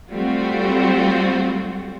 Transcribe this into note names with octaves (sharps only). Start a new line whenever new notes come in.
G3 A3 C4 F4 F#4